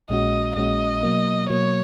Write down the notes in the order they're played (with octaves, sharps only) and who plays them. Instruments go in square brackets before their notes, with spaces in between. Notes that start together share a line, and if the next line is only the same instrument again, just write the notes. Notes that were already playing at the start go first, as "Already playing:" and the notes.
[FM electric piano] A#1 A#2 G#3 C#4 F#4 [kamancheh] D#5
[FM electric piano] A#1 A#2 G#3 C#4 F#4 [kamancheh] D#5
[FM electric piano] B2 F#3 A#3
[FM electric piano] B2 F#3 A#3 [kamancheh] C#5